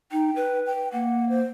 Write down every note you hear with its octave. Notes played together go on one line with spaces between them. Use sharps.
D#4 G5
B4
G5
A#3 F#5
C5